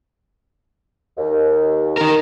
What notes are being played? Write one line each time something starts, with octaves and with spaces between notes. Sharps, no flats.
D#2
D#4 A#4